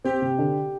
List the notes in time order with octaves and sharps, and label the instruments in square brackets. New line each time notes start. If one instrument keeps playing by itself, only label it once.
[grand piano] C4 [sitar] G4
[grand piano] C3
D3